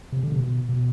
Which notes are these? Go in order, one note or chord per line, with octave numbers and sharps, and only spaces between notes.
C3
D3
C3
B2
B2